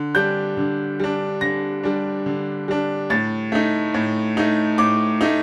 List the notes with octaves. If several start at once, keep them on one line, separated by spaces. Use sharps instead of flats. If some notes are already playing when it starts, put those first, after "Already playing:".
Already playing: D3
G3 D4 G6
D3
G3 D4
D3 A#6
G3 D4
D3
G3 D4
A2 A6
A3 D#4
A2
A3 D#4
A2 D6
A3 D#4